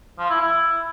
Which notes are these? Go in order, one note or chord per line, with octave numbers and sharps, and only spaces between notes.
F3
E4
E4